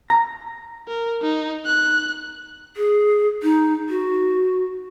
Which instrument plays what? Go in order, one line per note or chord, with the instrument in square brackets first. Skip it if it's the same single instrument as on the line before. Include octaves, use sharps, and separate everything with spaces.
[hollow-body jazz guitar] A#5
[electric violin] A#4
D#4
F#6
[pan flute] G#4
D#4
F#4